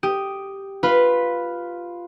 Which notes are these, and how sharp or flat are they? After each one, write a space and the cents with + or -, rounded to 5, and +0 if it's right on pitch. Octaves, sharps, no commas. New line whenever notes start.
G4 +0 D#6 +0
F4 +0 B4 +0 B5 +0